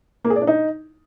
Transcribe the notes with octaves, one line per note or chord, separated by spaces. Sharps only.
A#3
G#4
D5
D4
D#4